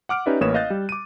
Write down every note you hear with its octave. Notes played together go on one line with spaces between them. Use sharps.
F#5 D6 F6 D7
C#4 D#4 G4 B4 D5 E5
A1 A#3 B4 C#5 D#6 E7
D#5 F5 F#6 G6 A6
G3
D6 D#7